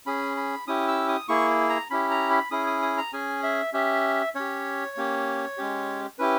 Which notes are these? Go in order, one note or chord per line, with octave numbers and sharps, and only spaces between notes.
C#4 G#4 B5
B5
C#4 E4 G4 D#6
E6
D#6
A#3 E4 G#4 C#6
A#5
C#4 E4 G4 B5
A#5
B5
C#4 E4 G#4 D#6
D#6
D#6
A#5
C#4 G#4 G#5
E5
C#4 G4 E5
C#4 G4 C#5
A#3 C#4 G4
G#3 C#4 G4
C#4 E4 G4 B4